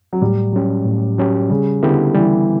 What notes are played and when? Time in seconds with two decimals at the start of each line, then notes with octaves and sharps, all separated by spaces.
0.13 F#3
0.22 A2 G3
0.53 F#3 C#4 G4
0.85 A2
1.19 F#3 C#4 G4
1.50 C#3 G3
1.83 D3 B3 E4 G4
2.15 E3 G3